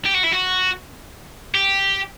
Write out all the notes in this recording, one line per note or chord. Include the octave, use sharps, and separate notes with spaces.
G4
F#4
E4
F#4
G4